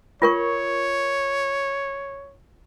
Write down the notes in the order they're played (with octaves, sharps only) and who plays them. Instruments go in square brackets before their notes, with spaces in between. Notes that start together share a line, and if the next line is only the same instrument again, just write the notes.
[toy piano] F4 A#4 C#6 [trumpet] C#5